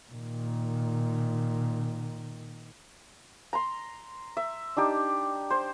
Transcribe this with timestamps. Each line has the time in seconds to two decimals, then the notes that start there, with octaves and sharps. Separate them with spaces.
0.11 A#2 D#3
3.53 A#5 C6
4.37 E5
4.77 D4 D#4 G4
5.50 C5